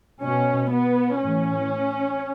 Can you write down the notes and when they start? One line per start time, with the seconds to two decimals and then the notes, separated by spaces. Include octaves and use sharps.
0.21 B2 C#4
0.71 B3
1.20 A2 E3 C#4